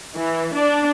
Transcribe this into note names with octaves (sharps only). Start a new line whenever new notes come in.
E3
D4